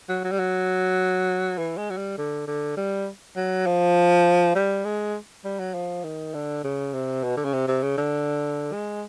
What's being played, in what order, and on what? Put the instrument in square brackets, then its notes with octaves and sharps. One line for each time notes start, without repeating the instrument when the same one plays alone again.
[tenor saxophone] F#3
F#3
G3
F#3
E3
G#3
F#3
G3
D3
D3
G3
F#3
F3
G3
G#3
G3
F#3
F3
D#3
D3
C#3
C3
B2
D3
C#3
C3
C3
C#3
D3
G#3